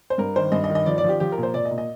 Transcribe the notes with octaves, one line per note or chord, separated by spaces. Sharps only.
C5
G2 A#4
D#3 C5
G2 D#5
D#5
D#3
D#5
F3 D5
D5
F3
G4
F3 G4
A#4
A#2
C5
A#2 D5
D#5
A#2
D#5